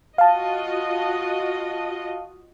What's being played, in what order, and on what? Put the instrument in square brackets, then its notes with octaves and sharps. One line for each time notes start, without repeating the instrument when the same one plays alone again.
[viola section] F4 F#4 D#5 [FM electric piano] F5 A5